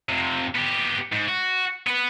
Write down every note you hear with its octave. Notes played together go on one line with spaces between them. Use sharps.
F2 C3
B3 G4
G#2
F#4
B3 B4